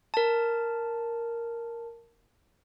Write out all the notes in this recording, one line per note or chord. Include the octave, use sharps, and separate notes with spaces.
A#4 A5